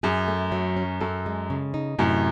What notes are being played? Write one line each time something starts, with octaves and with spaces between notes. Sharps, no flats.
F#2 G#4
A3
F#3
C#4
F#2 A4
G#3
C#3
D#4
F#2 A2 C3